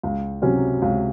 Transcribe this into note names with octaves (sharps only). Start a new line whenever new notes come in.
C#2
C3 F#3 C#4
C#2